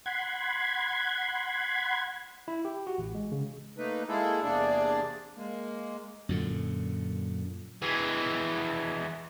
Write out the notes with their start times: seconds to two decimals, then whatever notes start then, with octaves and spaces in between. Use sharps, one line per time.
0.06 F#5 B5 C6 G#6
2.48 E4
2.65 G4
2.87 F#4
2.98 A1
3.15 G#3
3.32 C#3
3.78 A3 A#3 D#4 B4
4.08 G#3 A#3 E4 G#4 A4
4.43 E2 C3 A#3 D4 G#4 D5
5.36 G#3 A#3
6.29 F#2 A#2 D3
7.82 E3 G#3